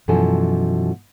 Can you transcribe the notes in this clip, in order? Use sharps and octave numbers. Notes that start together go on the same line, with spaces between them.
F#2 B2 E3 F3 A4 G#5